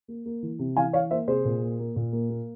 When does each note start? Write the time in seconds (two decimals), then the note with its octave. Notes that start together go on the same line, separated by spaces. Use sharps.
0.08 A#3
0.26 A#3
0.43 E3
0.59 C3
0.77 E3 F5 G#5
0.93 E3 C#5 F5
1.11 A#3 C5 E5
1.27 C3 G#4 C5
1.45 A#2
1.62 A#3
1.79 A#3
1.96 A#2
2.13 A#3
2.30 A#3